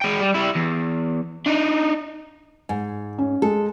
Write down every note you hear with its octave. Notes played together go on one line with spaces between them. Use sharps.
G#3 G5
G3
G3 E4
E2
D4 D#4
G#2 G#5
C#4
G#3 A4